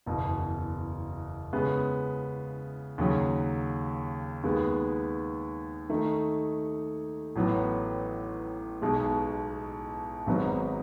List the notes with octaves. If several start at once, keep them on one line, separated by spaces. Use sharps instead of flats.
F#1 E2 B2
C#3 G#3 B3 E4
D#2 C#3 F#3
D#2 D#3 G#3 B3
D#3 A3 D#4
A1 A2 F#3 B3
B1 B2 G#3
G#1 G#2 F#3 B3 D#4